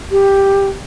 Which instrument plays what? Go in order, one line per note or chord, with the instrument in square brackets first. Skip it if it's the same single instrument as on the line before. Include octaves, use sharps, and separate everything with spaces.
[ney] G4